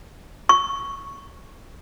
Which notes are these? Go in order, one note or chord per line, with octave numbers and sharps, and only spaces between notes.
C#6